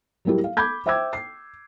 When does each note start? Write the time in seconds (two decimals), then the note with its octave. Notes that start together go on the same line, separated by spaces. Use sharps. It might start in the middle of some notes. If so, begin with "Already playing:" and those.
0.25 F#3 G3 A#3 E4 G4
0.44 F5
0.57 B5 D6 G6 G#6
0.86 C5 E5 G5 D6 E6 G#6
1.13 C7